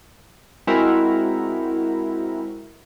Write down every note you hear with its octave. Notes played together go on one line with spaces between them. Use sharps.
G#3 C4 E4 F#4 A#4